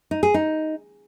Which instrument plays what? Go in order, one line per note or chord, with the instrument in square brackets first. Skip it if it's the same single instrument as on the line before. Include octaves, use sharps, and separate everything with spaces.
[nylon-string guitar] D#4
G#4
D#4